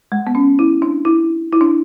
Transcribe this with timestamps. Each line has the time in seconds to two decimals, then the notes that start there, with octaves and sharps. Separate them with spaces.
0.12 G#3
0.27 B3
0.35 C#4
0.59 E4
0.82 D4
1.05 E4
1.53 E4
1.61 D4